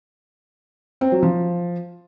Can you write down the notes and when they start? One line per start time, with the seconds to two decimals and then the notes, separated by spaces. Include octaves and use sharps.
1.01 C4
1.12 F#3
1.23 F3